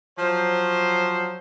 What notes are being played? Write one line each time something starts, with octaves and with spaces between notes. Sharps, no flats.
F3 F#3 C5